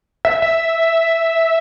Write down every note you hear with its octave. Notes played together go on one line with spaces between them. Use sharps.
E5
E5